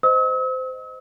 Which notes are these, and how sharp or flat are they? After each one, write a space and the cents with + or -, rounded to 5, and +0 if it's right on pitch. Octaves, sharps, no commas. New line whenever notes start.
C5 -20 D#5 +0 E6 -45